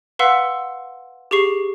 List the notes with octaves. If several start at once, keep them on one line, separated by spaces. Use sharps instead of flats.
B4 F5 F#5 C6 E6 B6
G4 G#4 C#6 C7